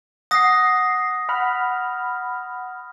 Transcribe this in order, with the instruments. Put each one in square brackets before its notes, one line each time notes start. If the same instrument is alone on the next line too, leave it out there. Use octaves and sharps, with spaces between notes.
[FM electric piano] F#5 C7 [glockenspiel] D#6 A#6
[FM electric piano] F#5 B5 F6